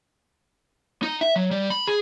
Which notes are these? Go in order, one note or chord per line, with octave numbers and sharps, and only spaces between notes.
D#4
E5
F#3
G3
B5
G#4